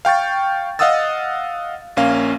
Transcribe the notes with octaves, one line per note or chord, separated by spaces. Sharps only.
F5 G5 C#6 A6
D#5 F5 F#5 D#6 E6 A6
A#1 A#3 C#4 F5